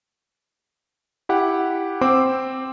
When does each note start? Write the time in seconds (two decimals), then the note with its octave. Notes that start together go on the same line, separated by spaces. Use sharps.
1.29 E4 G4 F#5
2.01 C4 C5 D6 E6